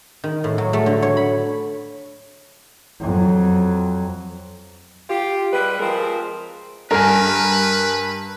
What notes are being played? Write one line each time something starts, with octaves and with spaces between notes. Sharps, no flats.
D#3
A2
F#3
A3
D3
C#5
B5
F2 F#3
F4 G4
G3 G#3 B4
F3 G#3 C4 G#4 A#4
G2 A#4 B4 G#5 A#6